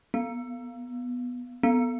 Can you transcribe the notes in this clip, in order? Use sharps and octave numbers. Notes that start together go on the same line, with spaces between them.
B3
B3